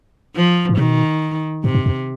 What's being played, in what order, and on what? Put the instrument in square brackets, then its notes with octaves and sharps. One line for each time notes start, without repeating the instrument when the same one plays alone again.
[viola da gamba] F3
[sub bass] G#2
[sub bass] B2 [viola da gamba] D#3
[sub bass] G#2 [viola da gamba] C3
[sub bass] G2
F2